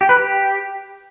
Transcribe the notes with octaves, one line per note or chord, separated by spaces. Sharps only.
G4
B4
G4